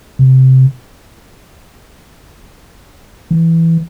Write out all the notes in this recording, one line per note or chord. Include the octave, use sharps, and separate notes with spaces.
C3
E3